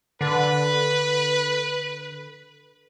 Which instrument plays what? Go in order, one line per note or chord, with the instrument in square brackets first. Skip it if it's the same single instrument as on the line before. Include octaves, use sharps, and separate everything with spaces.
[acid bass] D3 [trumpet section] B4